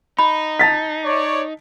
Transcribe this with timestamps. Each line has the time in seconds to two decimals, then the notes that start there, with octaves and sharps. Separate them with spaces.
0.19 D#4 B5
0.59 A5 A6 B6
1.04 C#5 D5